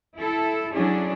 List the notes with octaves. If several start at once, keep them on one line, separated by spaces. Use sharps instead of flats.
E4 A4
F#3 C#4 D4 E4 G#4